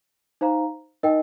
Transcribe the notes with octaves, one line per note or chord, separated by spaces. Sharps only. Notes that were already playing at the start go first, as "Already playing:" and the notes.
D#4 C5 F5 A#5
D#4 A#4 D#5 G5